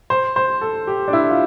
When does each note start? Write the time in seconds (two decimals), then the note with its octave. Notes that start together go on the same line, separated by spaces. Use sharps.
0.10 C5
0.36 C5
0.61 A4
0.87 G4
1.08 D4
1.13 E4
1.30 F4